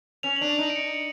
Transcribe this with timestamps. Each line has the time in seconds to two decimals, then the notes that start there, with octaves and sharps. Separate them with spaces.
0.23 C#4 F7
0.36 F#7
0.41 D4
0.49 F7
0.59 D#4 F#7
0.70 D7
0.76 C#7
0.87 D7
0.94 C#7